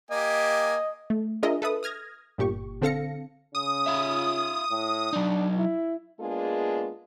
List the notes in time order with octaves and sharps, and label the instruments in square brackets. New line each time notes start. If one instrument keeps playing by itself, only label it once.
[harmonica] A#3 G4 G#5 [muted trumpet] D#5
[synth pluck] A3
D4 F4 G#4 A#4 D#5 E5
A4 B4 E5 D#6
D#6 F6 G#6 A#6
G1 A#2 G4 C#6
D3 C4 A4 F5 A#6 C#7
[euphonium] C#3 [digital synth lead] D#6
[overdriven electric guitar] F4 E5
[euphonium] A2
[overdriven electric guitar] F#3 D#4 [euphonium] D4
[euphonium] E4
[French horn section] G#3 A#3 B3 D4 F4 G#4